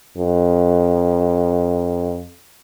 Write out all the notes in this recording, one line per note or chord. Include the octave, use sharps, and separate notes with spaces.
F2